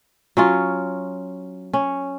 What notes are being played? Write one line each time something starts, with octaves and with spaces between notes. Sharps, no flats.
F#3 C#4 F4
C#4